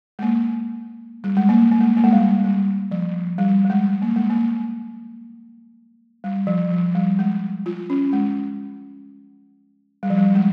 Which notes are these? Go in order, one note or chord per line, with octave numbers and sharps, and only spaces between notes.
G#3
A#3
G3
G#3
A#3
A#3
G#3
A#3
G#3
G3
G3
F3
G3
G3
G#3
A#3
G#3
A#3
G3
F3
F3
G3
G#3
F4
C#4
G#3
G3
F3
G3
G#3